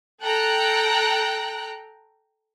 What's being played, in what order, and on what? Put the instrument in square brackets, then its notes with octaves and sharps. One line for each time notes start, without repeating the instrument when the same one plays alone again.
[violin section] A4 G5 A#5 F#6